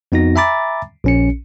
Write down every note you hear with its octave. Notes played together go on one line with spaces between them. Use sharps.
F2 B3 D#4 F#4 A#6
E5 G#5 A#5 B5 D6 A6
A#1 C#4 C#7